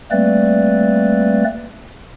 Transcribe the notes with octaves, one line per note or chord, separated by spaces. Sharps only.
G3 A3 A#3 C4 B4 D5